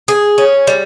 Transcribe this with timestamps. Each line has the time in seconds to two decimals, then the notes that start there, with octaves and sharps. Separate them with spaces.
0.08 G#4
0.38 C#4
0.67 G3